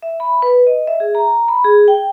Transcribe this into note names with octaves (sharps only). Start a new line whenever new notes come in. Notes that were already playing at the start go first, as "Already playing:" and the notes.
E5
B5
B4
D#5
E5
G#4
A#5
B5
G#4
G5